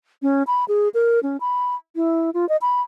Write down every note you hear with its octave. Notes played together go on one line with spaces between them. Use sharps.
C#4
B5
G#4
A#4
C#4
B5
E4
F4
D#5
B5